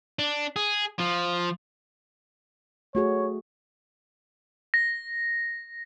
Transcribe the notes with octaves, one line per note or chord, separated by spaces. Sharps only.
D4
G#4
F3
A3 F#4 G#4 C#5
A#6